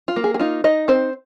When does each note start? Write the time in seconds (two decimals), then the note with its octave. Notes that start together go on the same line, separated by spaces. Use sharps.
0.08 F4
0.16 A#3
0.24 G#4
0.34 G#4
0.40 D#4 F4
0.64 D#4 D#5
0.88 C4 C5